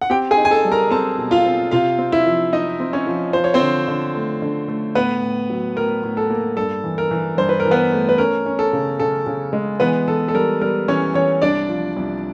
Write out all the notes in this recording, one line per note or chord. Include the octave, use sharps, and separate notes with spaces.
F#5
C4 G4 G5
G#4 G#5
D#4
G#5
A4 A5
G3
A#4 A#5
C4 A4 A5
B2
F4 F5
C4
C3 F4 F5
C4
E4 E5
F3
C4 D#4 D#5
C4
C#4 C#5
F3
F3 C5
C#5
C4 C5
D3
D3
A3
D3
A3
A2 B3 B4
A2
F#3
A2 A#4
A2
A4
A#3
G2 A4
E3
A#4
E3
G2 C5
B4
A#4
E3
B3 B4
A3
B4
C#4 A#4
C#4
A4
C#3
C#3 A4
C#3
G#3
E3 B3 B4
E3 A4
A4
G3 A#4
G3 A#4
E3 C#4 C#5
E3 C#4 C#5
C2 D4 D5
F3
C2